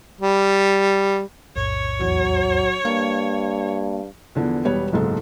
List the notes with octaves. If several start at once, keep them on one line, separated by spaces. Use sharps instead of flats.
G3
B1 F2 A2 C#5
E2 F#3
G2 A#3 F5
E2 D3 F3 B3
E1 G3 B3 C#5
F#1 B1 G#2 A4